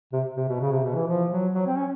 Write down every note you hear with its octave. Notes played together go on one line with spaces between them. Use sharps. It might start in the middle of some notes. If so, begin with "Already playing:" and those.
C3
C3
B2
C#3
C3
B2
E3
F3
F#3
F#3
C4
C#4